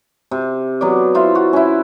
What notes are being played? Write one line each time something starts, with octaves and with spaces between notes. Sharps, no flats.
C3
F#3 B3 D5
E4 F4 C5
F#4
C#4 E4